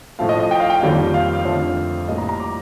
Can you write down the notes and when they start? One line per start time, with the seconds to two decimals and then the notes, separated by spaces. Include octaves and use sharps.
0.19 A2 F3 A3 F5
0.29 D#5
0.40 D#5
0.51 G5
0.60 F5
0.70 G5
0.81 F2 D#3 G3 A#3
1.14 F5
1.45 F2 D3 A3
2.08 A2 G3 A#3 D#5
2.18 A#5
2.29 A#5
2.40 D6